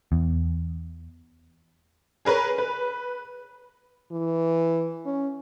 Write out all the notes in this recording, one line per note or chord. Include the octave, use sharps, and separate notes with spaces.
E2
G#4 A#4 B4 C#5
B4
E3
C#4